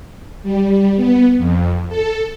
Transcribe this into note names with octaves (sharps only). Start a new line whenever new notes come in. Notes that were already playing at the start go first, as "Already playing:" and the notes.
G3
B3
F2
A4